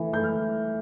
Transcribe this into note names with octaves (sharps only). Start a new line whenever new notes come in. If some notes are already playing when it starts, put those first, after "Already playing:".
Already playing: E3 A3 E4
E3 A3 E4 G6
F6